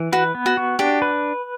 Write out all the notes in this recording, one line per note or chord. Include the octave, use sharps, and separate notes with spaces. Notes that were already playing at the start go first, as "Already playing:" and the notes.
Already playing: E3
F#4 B4
B3
F#4
F#4
D4 G4
B4